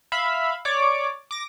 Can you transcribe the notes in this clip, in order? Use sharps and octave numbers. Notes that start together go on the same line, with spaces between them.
E5 F5 B5
C#5 D5 D6
D6 A#6